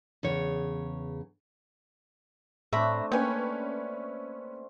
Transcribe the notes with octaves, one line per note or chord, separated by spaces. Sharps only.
E2 C#3 C#5
A2 A3 C4 D4 E5 A#5 B5
A#3 C#4 B4 C#5 G5 G#5